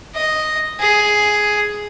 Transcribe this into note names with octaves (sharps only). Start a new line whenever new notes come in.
D#5
G#4